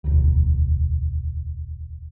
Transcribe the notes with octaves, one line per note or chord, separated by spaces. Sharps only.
E1 D2